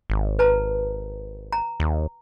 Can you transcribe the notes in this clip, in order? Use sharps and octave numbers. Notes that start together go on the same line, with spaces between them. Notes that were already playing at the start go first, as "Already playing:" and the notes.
G#1
B4 A5 A#5
A#5
D#2